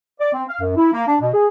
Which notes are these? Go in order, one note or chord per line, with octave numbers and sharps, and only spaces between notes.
D5
C4
F5
F#2
E4
A#3
D4
B2
G#4